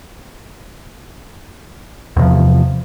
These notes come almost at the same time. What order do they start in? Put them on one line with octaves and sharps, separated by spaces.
E2 C3 F3